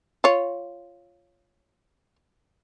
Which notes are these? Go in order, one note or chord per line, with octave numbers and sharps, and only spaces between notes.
F4 C#5